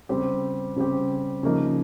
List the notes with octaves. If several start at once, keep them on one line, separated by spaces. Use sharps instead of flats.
C#3 G3 C4 G4
C#3 G3 C4 G4
C#3 F3 A#3 D#4